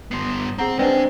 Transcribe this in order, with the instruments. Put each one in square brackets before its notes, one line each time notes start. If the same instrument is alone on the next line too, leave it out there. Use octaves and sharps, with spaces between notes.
[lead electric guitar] G2 B3 [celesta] C6 C7
[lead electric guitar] C4 [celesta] G#4 F#5 A#5
[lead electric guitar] G#3 G#4 [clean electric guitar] C4 D4 [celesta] B4 G5